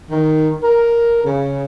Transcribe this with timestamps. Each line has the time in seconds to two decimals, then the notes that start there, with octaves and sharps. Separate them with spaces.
0.10 D#3
0.61 A#4
1.24 C#3